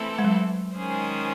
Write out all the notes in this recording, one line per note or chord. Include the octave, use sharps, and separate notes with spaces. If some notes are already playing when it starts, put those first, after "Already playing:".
Already playing: E3 A3 C4 E4 A4
G#3
F#3
D#3 G#3 C#4 G#4 C5